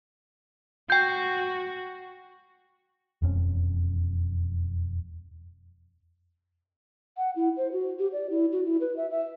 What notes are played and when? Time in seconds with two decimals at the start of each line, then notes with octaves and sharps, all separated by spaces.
0.90 F#4 G5 G6
3.22 E1 F2 C#4
7.17 F#5
7.36 E4
7.57 C5
7.72 F#4
7.99 G4
8.12 D5
8.30 E4
8.52 F#4
8.66 E4
8.81 B4
8.97 E5
9.10 E5